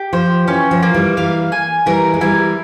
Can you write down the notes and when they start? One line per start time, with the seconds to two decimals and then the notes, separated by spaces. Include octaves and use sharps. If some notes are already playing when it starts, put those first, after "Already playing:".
Already playing: G4
0.13 F3 C5
0.48 E3 C#4
0.71 F3
0.83 A#3
0.94 E3 G3
1.17 E3 G3 F5
1.52 G#5
1.86 E3 G3 A#4
2.14 G#3
2.21 E3 G3 E4